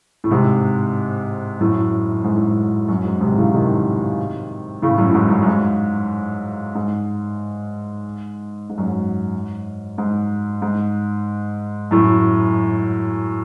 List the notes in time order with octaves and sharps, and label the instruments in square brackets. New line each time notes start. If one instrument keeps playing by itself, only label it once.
[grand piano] A2
G#2 C3
F#2 A2
G#2
A2
G#2
F#2
G#2
G#2 C3
C3
A2 C#3
C3 D#3
A2 C#3
F#2 A2
A2
G#2
F#2
F#2
G#2
G#2
G#2
F#2
G#2
G#2
G#2
F#2 A2